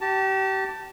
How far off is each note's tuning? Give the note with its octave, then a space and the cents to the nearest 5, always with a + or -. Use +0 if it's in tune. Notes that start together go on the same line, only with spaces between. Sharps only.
G4 -30 A5 +10